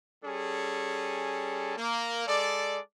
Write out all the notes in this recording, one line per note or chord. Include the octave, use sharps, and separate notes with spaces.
G3 C#4 G#4 A4
A#3
G#3 A4 D5